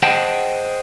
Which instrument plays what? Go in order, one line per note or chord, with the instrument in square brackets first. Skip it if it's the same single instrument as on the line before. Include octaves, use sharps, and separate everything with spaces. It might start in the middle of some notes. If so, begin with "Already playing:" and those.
[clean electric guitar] G#4 C5 D#5 F#5 G5 A5